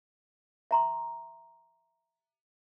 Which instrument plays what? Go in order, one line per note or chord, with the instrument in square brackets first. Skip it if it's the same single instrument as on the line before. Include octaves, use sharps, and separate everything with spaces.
[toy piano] E5 A#5 C6